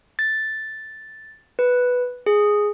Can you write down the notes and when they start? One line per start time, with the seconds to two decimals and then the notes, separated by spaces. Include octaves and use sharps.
0.19 A6
1.59 B4
2.26 G#4